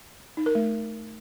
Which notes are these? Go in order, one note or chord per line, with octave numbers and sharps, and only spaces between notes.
D#4
A#4
A3